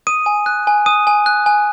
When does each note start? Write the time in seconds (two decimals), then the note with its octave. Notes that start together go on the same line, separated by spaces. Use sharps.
0.07 D#6 D#7
0.26 G#5
0.46 F#6
0.67 G#5
0.86 D#6 D#7
1.07 G#5
1.26 F#6
1.46 G#5